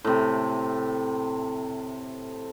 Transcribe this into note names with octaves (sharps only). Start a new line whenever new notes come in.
A2 C3